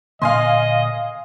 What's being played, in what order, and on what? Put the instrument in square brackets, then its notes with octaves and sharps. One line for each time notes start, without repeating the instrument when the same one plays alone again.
[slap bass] A#2 D3 A#3 [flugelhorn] D#5 [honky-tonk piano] F5 G#5 C6